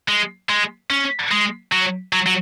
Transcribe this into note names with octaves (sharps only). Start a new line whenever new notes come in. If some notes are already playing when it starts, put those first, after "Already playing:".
G#3
G#3
C#4
G#3
F#3
F#3
F#3